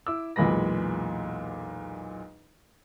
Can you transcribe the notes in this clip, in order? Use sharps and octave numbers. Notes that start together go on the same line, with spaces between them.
E4 D6 E6
B1 E2 A#2 G#3 B5 A#6